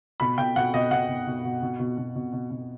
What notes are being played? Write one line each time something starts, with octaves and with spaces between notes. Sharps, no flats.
B2 B5
B2 G5
B2 F#5
B2 D#5
B2 F#5
B2
B2
B2
B2
B2
B2
B2
B2
B2